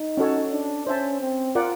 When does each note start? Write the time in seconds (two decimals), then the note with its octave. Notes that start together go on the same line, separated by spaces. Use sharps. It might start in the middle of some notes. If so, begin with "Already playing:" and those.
Already playing: D#4
0.17 C#4 F#4 A4 C#5
0.52 D4
0.86 C#4 C5 E5 A5
1.21 C4
1.55 F4 A#4 D5 F#5